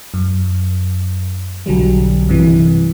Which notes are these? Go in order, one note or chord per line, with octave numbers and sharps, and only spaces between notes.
F#2
B1 D3 F#3 G3
G2 C3 E3